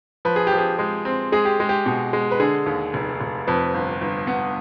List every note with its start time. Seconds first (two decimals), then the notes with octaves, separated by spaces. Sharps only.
0.25 F3 B4
0.36 G#4
0.47 G4
0.52 F3
0.58 G#4
0.79 G#3
1.05 C4
1.32 G#3 G#4
1.45 G4
1.60 G#3
1.69 G4
1.86 B2
2.13 G#3
2.31 B4
2.40 D3 G#4
2.66 D#2
2.94 F1
3.21 F1
3.47 F2 B4
3.74 G1
4.01 G1
4.27 B3